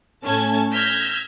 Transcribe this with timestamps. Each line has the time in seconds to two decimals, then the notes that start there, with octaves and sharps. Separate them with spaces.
0.22 A2 A3 C#4 G#5 A5 G#6
0.72 E6 F6 G6 G#6 A#6 B6